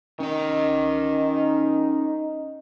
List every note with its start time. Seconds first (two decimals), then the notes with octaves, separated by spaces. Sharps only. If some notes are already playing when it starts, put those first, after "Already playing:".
0.20 D#3 C#4 D#5
1.11 D#4